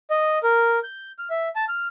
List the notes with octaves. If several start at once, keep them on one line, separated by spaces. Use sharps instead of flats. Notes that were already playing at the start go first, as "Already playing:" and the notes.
D#5
A#4
G6
F6
E5
A5
F6